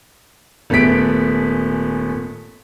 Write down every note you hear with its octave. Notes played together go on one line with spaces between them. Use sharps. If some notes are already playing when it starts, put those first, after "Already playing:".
D#1 A3 B3 G#4 B6 D7